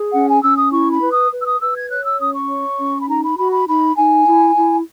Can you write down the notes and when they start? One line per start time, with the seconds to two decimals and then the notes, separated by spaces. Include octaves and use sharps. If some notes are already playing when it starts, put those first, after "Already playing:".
Already playing: G#4
0.13 C#4 F#5
0.27 G#5
0.42 C#4 E6
0.57 D#6
0.71 E4 C#6
0.91 B5
1.01 B4
1.11 D#6
1.31 B4
1.40 E6
1.46 D#6
1.60 B4 E6
1.75 G#6
1.90 C#5 F#6
2.04 E6
2.19 C#4 D#6
2.34 C#6
2.49 C#5
2.79 C#4
3.00 B5
3.08 D#4 A#5
3.23 B5
3.38 F#4 B5
3.52 B5
3.67 D#4 B5
3.96 D#4 G#5
4.26 E4
4.55 E4